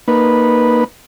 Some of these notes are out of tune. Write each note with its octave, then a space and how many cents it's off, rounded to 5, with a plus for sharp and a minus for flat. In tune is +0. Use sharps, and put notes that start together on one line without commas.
A#3 +0 D#4 -20 B4 -10